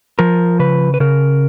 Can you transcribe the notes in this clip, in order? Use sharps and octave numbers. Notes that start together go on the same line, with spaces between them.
F3 A#4
C#3 B4
B4
C#3 A#4